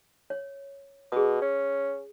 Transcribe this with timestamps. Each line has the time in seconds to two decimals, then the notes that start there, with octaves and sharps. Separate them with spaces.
0.30 C#5
1.12 B2 G#4 D#6
1.41 C#4